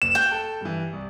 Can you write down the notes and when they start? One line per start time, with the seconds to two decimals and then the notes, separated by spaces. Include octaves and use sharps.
0.02 F#1 E7
0.15 G5 C#6 F#6 G6
0.31 A4
0.61 G2 E3
0.93 C2